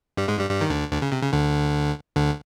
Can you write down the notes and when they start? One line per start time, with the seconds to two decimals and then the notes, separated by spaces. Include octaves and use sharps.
0.17 G2 G3
0.28 G#2 G#3
0.39 G2 G3
0.49 G2 G3
0.61 D#3
0.69 D2 D3
0.91 D2 D3
1.02 C#3
1.12 C3
1.22 C#3
1.33 D2 D3
2.16 D2 D3